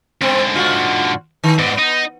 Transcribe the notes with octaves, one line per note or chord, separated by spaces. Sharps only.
G#2 D3 C4
F4 F#4
D#3
G#2 G3 B3
D#4